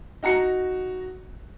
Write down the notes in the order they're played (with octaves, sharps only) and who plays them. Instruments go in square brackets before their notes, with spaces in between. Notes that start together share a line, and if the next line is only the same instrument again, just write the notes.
[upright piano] D#4 F#4 A#5 C#7